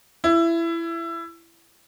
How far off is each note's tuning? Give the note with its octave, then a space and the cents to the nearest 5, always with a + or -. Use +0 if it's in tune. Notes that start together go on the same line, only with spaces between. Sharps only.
E4 +20